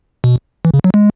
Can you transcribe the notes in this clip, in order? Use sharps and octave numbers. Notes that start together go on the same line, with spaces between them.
B2
E3
C#3
F#3
G#3